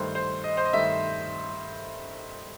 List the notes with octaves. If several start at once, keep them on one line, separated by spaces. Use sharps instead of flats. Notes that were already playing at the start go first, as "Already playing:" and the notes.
Already playing: G2 D#3 A3 C5
C5
D#5
C5
D#5
G2 D#3 A3 E5